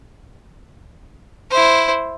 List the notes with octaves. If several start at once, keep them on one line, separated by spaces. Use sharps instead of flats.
E4 C5